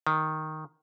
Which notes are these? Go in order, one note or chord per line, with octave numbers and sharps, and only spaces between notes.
D#3